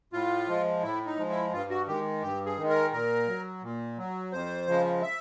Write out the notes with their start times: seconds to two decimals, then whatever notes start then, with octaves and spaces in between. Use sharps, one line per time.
0.13 A2 F4
0.48 F3 G#3
0.83 A2 E4
1.06 D#4
1.18 F3 G#3
1.30 E4
1.53 G2 F4
1.70 F#4
1.87 D#3 G#3 G4
2.22 G2 G4
2.46 G#4
2.58 D#3
2.63 G#3
2.69 A#4
2.92 A#2 A#4
3.28 F#3
3.63 A#2
3.98 F#3
4.32 F2 C5
4.67 C#3 F3 G#3
5.02 E5